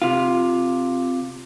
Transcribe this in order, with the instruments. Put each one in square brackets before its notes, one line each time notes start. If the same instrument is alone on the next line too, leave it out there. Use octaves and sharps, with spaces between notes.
[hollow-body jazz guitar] C3 F4